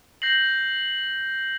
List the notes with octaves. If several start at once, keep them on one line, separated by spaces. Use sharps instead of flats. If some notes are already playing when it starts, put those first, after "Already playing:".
G6 A#6 C7 F#7